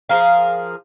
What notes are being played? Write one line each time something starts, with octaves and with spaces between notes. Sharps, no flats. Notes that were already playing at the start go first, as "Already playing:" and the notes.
F3 G#4 A#4 F5